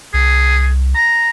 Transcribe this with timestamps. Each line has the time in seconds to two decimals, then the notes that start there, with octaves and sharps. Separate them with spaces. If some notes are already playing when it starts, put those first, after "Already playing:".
0.14 C2 G#4
0.95 A#5